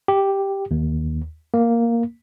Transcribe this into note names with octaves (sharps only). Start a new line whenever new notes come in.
G4
D#2
A#3